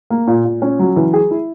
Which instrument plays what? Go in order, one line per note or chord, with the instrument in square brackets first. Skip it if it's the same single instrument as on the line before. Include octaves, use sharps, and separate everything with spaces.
[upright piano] A#3
A#2
A#2
C#4
F#3
E3
G#4
E4